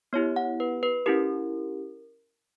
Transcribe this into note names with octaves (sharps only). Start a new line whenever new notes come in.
B3 E4 G4 C#5
F#5
B4
B4
C#4 E4 G4 A#4